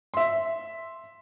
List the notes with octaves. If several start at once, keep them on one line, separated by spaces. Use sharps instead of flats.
E5 C6